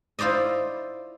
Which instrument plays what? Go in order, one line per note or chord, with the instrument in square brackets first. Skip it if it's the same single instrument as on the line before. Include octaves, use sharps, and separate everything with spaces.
[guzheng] E4 F4 C5 D5 D#5